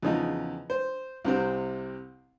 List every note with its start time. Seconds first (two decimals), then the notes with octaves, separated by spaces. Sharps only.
0.03 E2 C#3 F3 D#4
0.70 C5
1.25 C2 C3 C4